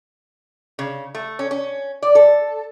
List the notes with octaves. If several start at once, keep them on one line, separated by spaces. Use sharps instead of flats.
C#3
A3
C#4
C#4
D5
A4